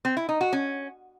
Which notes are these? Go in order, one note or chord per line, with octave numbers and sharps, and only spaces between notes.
C4
E4
D#4
F#4
C#4